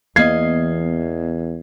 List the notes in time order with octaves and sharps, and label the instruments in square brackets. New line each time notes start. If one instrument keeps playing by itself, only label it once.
[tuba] E2 [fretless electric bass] E3 A#3 B3 [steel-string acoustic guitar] D#5 F5 [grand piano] G#6 C7